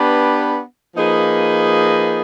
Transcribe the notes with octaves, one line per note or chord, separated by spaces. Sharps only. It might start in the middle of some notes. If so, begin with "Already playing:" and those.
Already playing: B3 D4 G4 B4
F3 A#3 D#4 G#4 B4